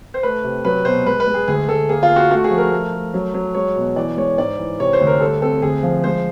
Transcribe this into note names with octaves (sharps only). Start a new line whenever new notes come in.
C5
A3 B4
C3
F#3 B4
B2 C5
G#3 B4
B4
G#3
G#4
D2 G#4
D2 A4
A#3 G#4
F4
A#3
F#4
A3 F#4
G#4
F3
A#4
A3
A3
F#3
F#3
G#3 C#5
B2
E3 D5
G#3 C#5
G#2 D5
E3
C3 C#5
C5
D2
A#4
G3 A4
C4 A4
D2 G#4
F3
G#3 C5